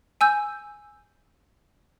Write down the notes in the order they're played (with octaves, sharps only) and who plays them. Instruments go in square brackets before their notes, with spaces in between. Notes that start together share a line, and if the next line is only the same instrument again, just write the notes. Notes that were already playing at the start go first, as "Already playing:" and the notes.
[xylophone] G#5 E6 G6